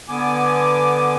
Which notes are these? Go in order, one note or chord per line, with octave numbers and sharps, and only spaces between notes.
D3 B3 G#5 D6